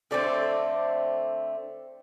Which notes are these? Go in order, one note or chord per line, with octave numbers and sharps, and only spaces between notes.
D3 A3 C4 D5